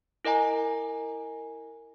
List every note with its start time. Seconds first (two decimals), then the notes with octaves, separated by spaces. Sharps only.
0.25 E4 A#4 D#5 G#5 A#5